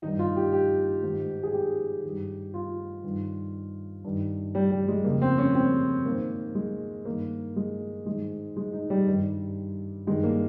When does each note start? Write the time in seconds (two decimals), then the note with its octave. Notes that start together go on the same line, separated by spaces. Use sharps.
0.02 G2 D#3 D#4
0.19 F4
0.36 G4
0.53 G4
1.03 G#2 D#3
1.43 G#4
1.53 G4
2.03 G2 D#3
2.54 F4
3.04 G2 D#3
4.04 G2 D#3
4.55 G3
4.71 G3
4.88 G#3
5.04 F2 C#3 A#3
5.22 C4
5.38 C#4
5.55 C4
6.05 G#2 D#3 A#3
6.55 G#3
7.05 G2 D#3 A#3
7.56 G#3
8.06 G#2 D#3 G#3
8.57 G#3
8.73 D#4
8.90 G3
9.06 G2 D#3
10.07 G2 D#3 G#3
10.24 A#3